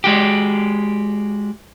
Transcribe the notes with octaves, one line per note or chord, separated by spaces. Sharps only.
G#3 F#4 G4